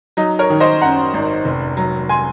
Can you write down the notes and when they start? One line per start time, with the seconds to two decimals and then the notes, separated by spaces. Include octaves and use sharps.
0.17 F#3 D#4
0.39 A#4 C#5
0.50 D#3
0.60 C5 D#5
0.81 F#2 F#5 A#5
1.14 G#1
1.45 F1
1.77 F#3
2.09 G#5 C6